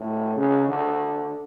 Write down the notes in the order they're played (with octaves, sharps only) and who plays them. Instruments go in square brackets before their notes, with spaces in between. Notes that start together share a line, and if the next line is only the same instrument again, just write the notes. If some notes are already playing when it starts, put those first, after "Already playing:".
Already playing: [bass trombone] A2
C#3
D3